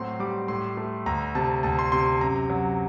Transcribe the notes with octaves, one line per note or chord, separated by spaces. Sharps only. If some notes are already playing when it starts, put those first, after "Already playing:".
Already playing: A2 F#3 C4 C6
G3 D6
A2 C6
A3
D2 A#5
C3 A5
D2 A5
C6
C3 C6
C6
F#2 A#5
F#3